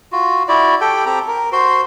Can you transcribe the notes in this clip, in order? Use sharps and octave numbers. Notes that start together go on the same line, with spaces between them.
F4 F#4
E4 F#4 D5
G4 A4 G5
C4 G4 A4 A#5
A#4
F#4 C5 C6